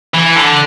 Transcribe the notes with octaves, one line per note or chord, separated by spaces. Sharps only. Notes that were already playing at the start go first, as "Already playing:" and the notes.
E3
D3